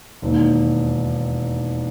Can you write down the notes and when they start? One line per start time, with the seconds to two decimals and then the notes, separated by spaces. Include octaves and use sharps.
0.22 E1 D#2 D#3